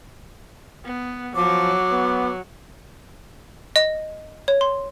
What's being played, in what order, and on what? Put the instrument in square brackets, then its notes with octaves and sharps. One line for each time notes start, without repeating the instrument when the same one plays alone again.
[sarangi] B3
[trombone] F3 [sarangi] F#3 [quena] D6
[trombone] B3
[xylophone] D#5
C#5
C6